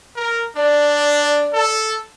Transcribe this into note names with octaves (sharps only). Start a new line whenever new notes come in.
A#4
D4 D5
A4